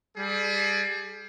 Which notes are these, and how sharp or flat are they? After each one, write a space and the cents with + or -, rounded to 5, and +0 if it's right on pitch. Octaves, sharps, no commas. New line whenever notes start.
G3 +20 G#4 +45